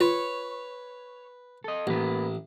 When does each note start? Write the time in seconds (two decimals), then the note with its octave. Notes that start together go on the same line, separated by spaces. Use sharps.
0.01 F4 B4 C#5
1.64 A4 D#5
1.87 A1 A#3 B4